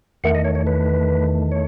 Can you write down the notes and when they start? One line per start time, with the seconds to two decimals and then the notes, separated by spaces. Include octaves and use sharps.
0.24 E2 D#3 A3 F#5
0.35 D#5
0.45 C#5
0.55 C#5
0.67 B4
1.52 C#5